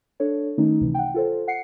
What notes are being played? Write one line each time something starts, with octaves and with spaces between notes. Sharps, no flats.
D4 A4 C#5
D#3 A3 C#4 D#4
C#2 C3 E3
F#5 G5
F4 A4 C5
F#5 C7 C#7